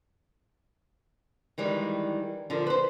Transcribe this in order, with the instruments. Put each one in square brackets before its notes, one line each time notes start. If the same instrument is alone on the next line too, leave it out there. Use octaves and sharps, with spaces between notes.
[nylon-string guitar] D#3 E3 G3 G#3
D3 F3 F4 A#4
B4 C5